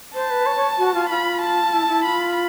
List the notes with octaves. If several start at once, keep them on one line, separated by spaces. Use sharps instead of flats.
C5 A5
B4
C#5
C#5
F#4
F4
F4 B5
A5
E4
E4
F4 B5